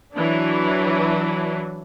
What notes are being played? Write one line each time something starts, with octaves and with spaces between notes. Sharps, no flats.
E3 F#3 D4